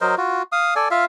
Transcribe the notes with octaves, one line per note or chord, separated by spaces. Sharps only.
F#3 A#4 C5 D#5
F4 F#4
F5 D#6
A4 D5 G#5
F4 E5 F5